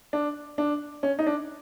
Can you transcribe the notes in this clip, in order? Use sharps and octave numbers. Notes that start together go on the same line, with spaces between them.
D4
D4
C#4
D#4
D4